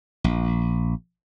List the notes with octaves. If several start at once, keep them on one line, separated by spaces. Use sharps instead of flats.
A#1